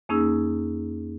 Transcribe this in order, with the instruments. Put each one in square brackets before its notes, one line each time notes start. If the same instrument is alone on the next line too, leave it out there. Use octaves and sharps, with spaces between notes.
[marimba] F2 A#3 C#4 D#4 G#4 E6